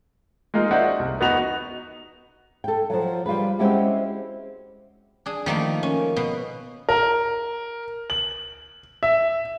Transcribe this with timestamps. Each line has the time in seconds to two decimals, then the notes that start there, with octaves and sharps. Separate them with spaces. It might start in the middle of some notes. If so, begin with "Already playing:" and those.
0.54 G#3 A#3 D#4 F4
0.71 D#4 F#4 C5 D5 E5 F#5
0.99 C2
1.20 E2 B3 D#4 F#4 F7
2.64 A4 G5
2.90 F3 F#3
3.26 G3 F4 G#4 B4
3.59 G#3 C4 C#4 E4 F#4 G4
5.26 D4 G#4
5.46 D#3 F3 A3 A#3
5.83 C#4
6.16 B2
6.89 A#4
8.10 F#7
9.03 E5